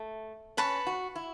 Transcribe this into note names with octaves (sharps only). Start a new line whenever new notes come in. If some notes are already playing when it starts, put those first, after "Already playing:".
Already playing: A3
C#4 B4 A5 C#6
F#4
E4